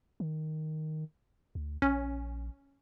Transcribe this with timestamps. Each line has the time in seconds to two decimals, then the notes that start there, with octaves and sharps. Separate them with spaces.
0.20 D#3
1.55 D2
1.82 A#1 C#4